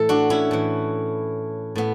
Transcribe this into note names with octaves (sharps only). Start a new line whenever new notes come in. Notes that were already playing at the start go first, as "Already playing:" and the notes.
Already playing: A2 E3 A4
D4 F#4
C#4 E4
A2 E3
A2 B3